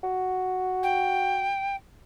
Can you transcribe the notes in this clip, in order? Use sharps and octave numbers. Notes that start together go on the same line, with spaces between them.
F#4
G5